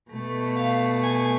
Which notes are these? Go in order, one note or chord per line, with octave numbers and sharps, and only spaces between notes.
B2 A3
F5
G#5